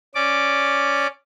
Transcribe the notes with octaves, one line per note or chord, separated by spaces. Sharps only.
C#4 D5 D6